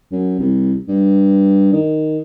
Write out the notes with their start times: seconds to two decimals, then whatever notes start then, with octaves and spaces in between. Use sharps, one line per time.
0.11 F#2
0.39 C2
0.88 G2
1.73 D#3